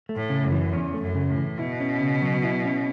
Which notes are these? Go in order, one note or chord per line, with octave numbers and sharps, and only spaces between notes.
A3
A2
C#3
F#2
E3
E2 C#4
A3
F#2
C#3
A2
E3
B2 E4
C#4
C#3
F#3
E4
C#4